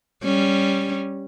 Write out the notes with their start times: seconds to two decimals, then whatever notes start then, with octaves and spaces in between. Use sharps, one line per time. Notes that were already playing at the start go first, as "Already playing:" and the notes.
0.23 G3 C#4